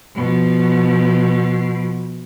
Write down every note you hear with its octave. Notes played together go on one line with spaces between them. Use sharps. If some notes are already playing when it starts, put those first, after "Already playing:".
B2 F3